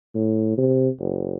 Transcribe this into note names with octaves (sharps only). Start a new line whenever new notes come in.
A2
C3
F#1